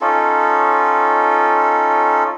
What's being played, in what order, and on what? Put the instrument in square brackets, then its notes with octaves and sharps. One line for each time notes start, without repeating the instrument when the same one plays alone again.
[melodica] C#4 D#4 F4 A4